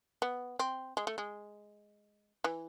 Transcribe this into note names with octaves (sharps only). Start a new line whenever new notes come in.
B3
C4
G#3
A3
G#3
E3